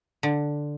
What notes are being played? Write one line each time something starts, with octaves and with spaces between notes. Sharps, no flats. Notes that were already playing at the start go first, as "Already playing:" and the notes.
D3